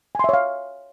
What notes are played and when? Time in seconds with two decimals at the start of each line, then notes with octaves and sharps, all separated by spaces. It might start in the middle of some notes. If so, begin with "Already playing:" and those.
0.15 G#5
0.19 C6
0.24 E5
0.29 C#5
0.33 F5